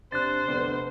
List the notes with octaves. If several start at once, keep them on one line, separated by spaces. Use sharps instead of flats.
C3 D4 C5 F#6 A6
F1 D3 B3 D5